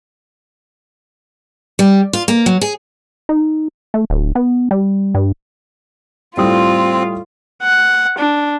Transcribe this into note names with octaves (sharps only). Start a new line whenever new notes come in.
G3
F4
A#3
F#3
G#4
D#4
A3
D1
B3
G3
G2
A2 G3 C4 F4 D#6
F#5
D4